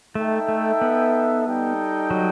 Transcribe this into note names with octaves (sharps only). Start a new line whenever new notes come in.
A3 D#4 A4 E5 G5
A3
B3
G3 D#4 A4 D#5 G5
F#3